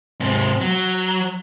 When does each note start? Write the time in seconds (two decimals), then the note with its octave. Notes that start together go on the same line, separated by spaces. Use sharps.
0.20 G#2 C3
0.60 F#3